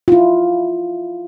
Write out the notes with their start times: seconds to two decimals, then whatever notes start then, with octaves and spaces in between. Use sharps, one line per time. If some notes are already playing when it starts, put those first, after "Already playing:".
0.08 E4 F4